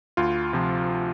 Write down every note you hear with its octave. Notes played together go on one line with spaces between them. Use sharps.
D2 F4
C3 F3